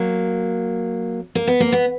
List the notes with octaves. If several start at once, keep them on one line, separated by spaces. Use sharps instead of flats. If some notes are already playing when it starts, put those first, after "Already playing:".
Already playing: F#3 A#3
A#3
B3
A#3
B3